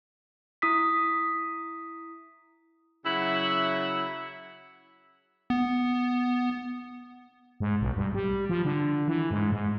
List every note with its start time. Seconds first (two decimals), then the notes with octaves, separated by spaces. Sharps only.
0.62 E4 D#6 B6
3.05 C#3 F#3 E4 E5 F#5
5.50 B3
7.60 G#2
7.81 B1
7.96 G2
8.14 G3
8.49 F3
8.65 D3
9.08 E3
9.31 G#2
9.52 G#2